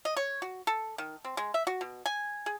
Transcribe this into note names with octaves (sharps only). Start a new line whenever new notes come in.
D#5
C#5
F#4
A4
D#3
C4
G#3
E5
F#4
B2
G#5
G#4